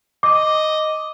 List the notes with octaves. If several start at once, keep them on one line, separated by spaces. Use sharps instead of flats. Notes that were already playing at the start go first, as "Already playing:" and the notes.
D#5 D6